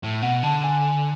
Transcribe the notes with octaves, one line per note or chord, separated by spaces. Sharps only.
A2
B2 F#5
D3 A5
G#5